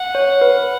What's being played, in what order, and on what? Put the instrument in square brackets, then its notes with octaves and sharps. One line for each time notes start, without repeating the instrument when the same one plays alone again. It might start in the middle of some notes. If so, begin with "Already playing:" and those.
Already playing: [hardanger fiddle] F#5
[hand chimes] C#5
B4